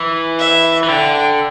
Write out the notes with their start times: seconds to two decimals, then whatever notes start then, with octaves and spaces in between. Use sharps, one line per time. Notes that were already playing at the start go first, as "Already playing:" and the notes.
Already playing: E3
0.39 E5
0.84 E3
0.88 D3 G5